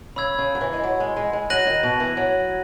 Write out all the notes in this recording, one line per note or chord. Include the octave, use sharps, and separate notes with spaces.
C#3 B5 E6 G#6
C#3
F#3
E3
G#3
F#3
G#3
G#3
G#3
F#3 F#6 A#6 D#7 F#7
D#3
B2
E3
F#3